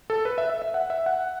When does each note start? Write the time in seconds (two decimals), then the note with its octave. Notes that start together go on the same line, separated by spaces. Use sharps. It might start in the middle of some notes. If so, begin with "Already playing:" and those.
0.10 A4
0.25 B4
0.38 E5
0.50 E5
0.62 E5
0.74 F#5
0.90 E5
1.06 F#5